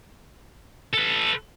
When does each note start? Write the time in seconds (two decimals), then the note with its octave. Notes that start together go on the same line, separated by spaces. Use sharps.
0.93 A4 B4